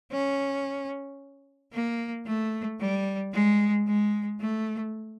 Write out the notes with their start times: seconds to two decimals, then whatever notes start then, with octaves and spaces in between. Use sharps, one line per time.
0.12 C#4
1.72 A#3
2.26 A3
2.80 G3
3.33 G#3
3.87 G#3
4.40 A3